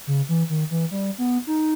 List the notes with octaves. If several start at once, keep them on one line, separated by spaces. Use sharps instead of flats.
C#3
E3
D#3
E3
G3
B3
D#4